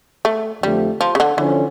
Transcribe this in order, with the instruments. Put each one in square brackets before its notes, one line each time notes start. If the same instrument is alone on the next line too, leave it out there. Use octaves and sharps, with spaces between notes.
[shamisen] A3
[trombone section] F2 D3 F3 A3 [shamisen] G3
[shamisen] F3
C#3
D3
[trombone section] D3 F3 C#4 [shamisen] E3